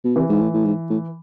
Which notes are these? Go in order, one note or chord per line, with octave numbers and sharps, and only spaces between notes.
B2
C3 E3
G#2
A2
A2
G#2
A2